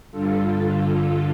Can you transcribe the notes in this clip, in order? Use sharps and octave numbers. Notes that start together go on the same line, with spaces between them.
G2 D3 F4 A4